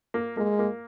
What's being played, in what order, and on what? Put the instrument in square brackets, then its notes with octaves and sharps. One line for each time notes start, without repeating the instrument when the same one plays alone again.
[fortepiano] A#3
[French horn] G#3 [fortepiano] A#3
[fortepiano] A#3